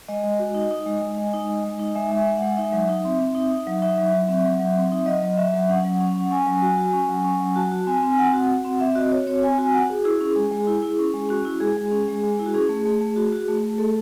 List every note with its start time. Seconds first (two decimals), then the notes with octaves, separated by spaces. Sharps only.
0.08 G#3 D#5
0.24 G#3
0.39 F#4
0.55 D#4
0.71 D#4
0.86 G#3
1.02 G#3
1.18 G#3
1.34 D#4
1.49 G#3
1.64 G#3
1.79 D#4
1.95 G#3 E5
2.11 G#3 E5
2.27 G#3
2.37 F#5
2.42 G#3
2.57 D#4 E5
2.73 F#3
2.89 D#4
3.05 C4
3.20 C4
3.35 D#4
3.52 D#4
3.67 F#3
3.82 D#4 E5
3.98 F#3
4.13 F#3
4.28 C4
4.45 F#3
4.60 F#3
4.75 C4
4.92 D#4
5.06 F#3 D#5
5.22 F#3
5.38 F#3 E5
5.54 F#3
5.69 C#4 F#5
5.85 F#3
6.01 C#4
6.16 C#4
6.31 C#4 G#5
6.46 F#3
6.62 F#4
6.78 F#4
6.94 C#4
7.09 F#3
7.24 C#4
7.40 F#3
7.56 F#4 A5
7.72 F#4
7.87 C4 G#5
8.03 C4
8.12 G#5
8.18 C4 F#5
8.33 F#4
8.49 F#4
8.65 C4
8.80 C4 E5
8.95 F#4 D#5
9.12 F#4 C#5
9.27 C4 C#5
9.43 C4 G#5
9.58 F#4 G#5
9.73 F#4 F#5
9.90 F#4 G#4
10.04 E4 G#4
10.21 C#4
10.36 G#3
10.51 G#3
10.67 E4
10.83 E4
10.99 C#4
11.14 G#3
11.29 C#4 F#4
11.45 E4
11.60 G#3 G#4
11.77 G#3
11.91 C#4
12.08 G#3
12.23 G#3
12.39 E4
12.46 F#4
12.54 C#4 G#4
12.69 A3
12.86 A3
13.01 A3
13.16 F#4
13.32 F#4
13.48 A3
13.63 A3
13.78 A3 A4